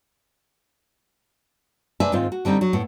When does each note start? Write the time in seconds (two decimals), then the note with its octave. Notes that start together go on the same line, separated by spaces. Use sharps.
2.00 C3 D4 B4 E5 G#5
2.12 G#2 D#3 C4 F4
2.32 F#4
2.45 D3 G3 C4 D#4
2.61 F#3
2.73 A2 B3